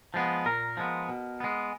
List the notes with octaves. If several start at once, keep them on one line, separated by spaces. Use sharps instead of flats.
F3 G#3 B3
A#2 A#4
F3 G#3 B3
B2
G#3 B3